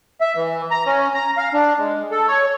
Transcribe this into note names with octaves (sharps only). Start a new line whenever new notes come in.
E5
E3
A#5
C#4
A#5
F5
D4
G#3
A4
C#5